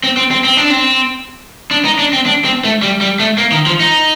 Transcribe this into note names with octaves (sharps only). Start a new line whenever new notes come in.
C4
C4
C4
C4
D4
C4
D4
D#4
D4
C4
D4
C4
A3
G3
G3
A3
A#3
D#3
F3
D#4